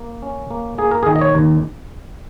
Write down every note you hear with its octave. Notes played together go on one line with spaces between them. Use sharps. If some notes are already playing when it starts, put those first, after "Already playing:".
Already playing: A#3
C#4
A#3
A#3 G#4
A#4
G#4
D#3
D#5
C#5
D#2